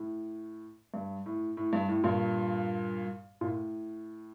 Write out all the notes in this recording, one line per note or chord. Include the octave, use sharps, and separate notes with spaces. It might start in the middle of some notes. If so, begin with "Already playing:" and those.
Already playing: A2
G2
A2
A2
G2
A2
G2 A#2
A#2
A2